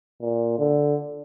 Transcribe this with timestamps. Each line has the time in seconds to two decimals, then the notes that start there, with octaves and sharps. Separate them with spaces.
0.22 A#2
0.58 D3